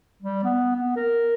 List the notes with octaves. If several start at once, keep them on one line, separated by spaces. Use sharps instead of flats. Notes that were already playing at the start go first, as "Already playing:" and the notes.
G3
B3
B3
A#4